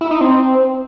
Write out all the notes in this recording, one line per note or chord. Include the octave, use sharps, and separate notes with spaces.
E4
D#4
C4